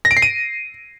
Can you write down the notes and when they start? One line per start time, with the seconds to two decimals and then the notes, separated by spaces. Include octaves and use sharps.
0.05 A#6
0.11 D7
0.17 C7
0.22 D#7